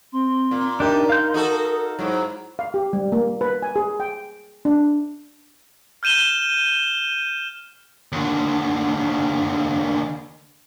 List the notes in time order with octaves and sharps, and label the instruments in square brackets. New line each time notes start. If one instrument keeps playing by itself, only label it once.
[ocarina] C4 [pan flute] C6
[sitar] A#2
[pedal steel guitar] D4 G4 [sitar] D#4 [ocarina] A#4 [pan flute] E5
[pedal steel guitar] F5 G6 [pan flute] C6
[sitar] D#4 F#4 A4 [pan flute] D#6
[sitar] G#2 F#3 [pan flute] E4
[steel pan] F5
G4
G3
A#3
B4
G#5
G#4
G5
D4
[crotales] F6 G6 D#7 E7 G7
[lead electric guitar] D#2 D3